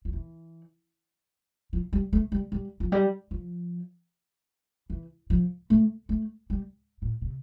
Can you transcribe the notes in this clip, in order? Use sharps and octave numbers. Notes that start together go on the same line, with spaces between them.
F3
E3
F3
G3
A3
G3
G3
F3
G3
F3
E3
F3
A3
A3
G3
A2
C3